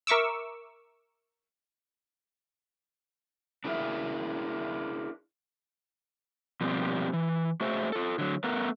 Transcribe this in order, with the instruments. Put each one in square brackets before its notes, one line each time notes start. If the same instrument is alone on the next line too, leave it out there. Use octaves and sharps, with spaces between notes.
[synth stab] A#4 E5 C#6 D6 E6
[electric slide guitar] D4 E4 G#4 A#4 E5
B2 F3 G3 A#3 C4 G4
E3
A3 F#4 G#4 C5 E5
F4 A4
D3 F#3
A3 B3 A#4 B4